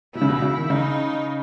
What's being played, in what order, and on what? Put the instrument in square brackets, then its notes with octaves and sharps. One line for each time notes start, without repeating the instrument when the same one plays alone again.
[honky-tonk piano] B2 [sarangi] E4
[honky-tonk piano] C#3
B2
C#3
D#3
[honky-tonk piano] C#3 [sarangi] D#4